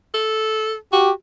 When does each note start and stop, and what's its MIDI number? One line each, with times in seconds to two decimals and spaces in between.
0.14 0.75 69
0.92 1.10 66
0.92 1.11 67